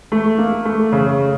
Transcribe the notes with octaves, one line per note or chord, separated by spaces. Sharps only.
A3
A#3
A3
C#3